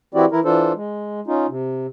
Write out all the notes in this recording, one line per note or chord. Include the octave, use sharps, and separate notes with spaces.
E3 C4 E4 F#4 G4 D5
E3 E4 A#4
E3 D4 F4 A4 C5
G#3
C#4 D#4 F4
C3